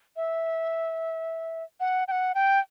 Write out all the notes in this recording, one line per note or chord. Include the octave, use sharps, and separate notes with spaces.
E5
F#5
G5
F#5
G5